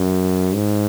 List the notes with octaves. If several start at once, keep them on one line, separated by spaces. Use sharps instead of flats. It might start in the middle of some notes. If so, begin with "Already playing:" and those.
Already playing: F#2
G#2